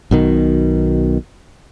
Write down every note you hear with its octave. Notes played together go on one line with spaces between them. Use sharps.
B1 B2 D#3